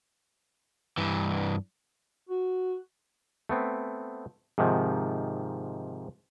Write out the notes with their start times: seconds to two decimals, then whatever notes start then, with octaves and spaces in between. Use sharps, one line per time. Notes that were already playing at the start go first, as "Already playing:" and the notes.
0.98 G2 E3
2.29 F#4
3.49 A3 B3 C4
4.58 G#2 C3 D#3 F3